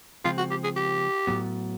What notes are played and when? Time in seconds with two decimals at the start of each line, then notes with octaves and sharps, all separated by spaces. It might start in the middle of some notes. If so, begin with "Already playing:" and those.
0.24 C#3 F3 G#3 C4 F4
0.38 F#4
0.51 G4
0.64 G#4
0.76 G4
1.27 A2 F#3 B3